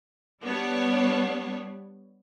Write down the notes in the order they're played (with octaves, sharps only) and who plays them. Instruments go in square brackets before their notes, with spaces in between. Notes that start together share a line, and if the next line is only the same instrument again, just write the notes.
[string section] G3 B3 D4 C#5